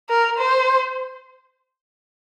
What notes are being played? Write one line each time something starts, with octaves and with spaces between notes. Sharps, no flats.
A#4
C5